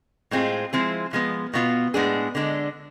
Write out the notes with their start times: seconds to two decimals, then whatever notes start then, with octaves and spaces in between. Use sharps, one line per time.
0.31 A2 G#3 C4 F4 G#4
0.73 F3 G#3 C4 E4 G#4
1.13 F3 G#3 B3
1.54 B2 B3 F4
1.94 A2 G#3 B3 D4 G#4
2.35 D3 G#3 D4